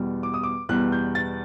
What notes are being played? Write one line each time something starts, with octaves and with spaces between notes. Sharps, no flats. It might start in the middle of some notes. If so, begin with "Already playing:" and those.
Already playing: E2 B2 G3
D6
D#6
D6
E2 B2 G3 F#6
G6
A6